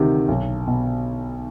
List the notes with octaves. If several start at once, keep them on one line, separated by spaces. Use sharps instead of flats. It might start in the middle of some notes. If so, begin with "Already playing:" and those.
Already playing: D2 C3 D#3
B1
B2